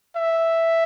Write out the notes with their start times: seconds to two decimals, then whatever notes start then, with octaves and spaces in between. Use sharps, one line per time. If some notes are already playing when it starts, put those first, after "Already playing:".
0.16 E5